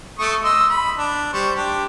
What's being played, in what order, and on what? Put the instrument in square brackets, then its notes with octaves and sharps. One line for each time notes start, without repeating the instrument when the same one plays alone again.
[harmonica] A3 C#6 D#6
D#5 C6 E6
B5
D4
G3 C5 C#6
D4 G4